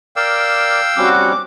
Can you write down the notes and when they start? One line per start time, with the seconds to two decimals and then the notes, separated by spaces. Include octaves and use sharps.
0.16 A#4 D5 F5 G5 D6 E6
0.97 G3 C4 C#4 F#4 D6